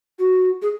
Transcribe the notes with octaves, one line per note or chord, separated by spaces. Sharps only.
F#4
G#4